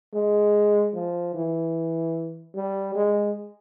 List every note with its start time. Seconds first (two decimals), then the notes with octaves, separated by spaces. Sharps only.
0.14 G#3
0.94 F3
1.34 E3
2.55 G3
2.95 G#3